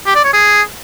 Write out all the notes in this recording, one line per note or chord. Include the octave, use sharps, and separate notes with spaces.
G4
D5
C#5
G#4